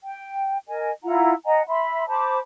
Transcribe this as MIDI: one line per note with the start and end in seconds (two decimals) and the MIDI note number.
0.05 0.58 79
0.68 0.91 70
0.68 0.91 75
0.68 0.91 80
1.03 1.32 64
1.03 1.32 65
1.03 1.32 78
1.03 1.32 82
1.45 1.62 75
1.45 1.62 78
1.45 1.62 80
1.45 1.62 82
1.68 2.04 76
1.68 2.04 83
1.68 2.04 84
2.08 2.40 72
2.08 2.40 81
2.08 2.40 83
2.08 2.40 86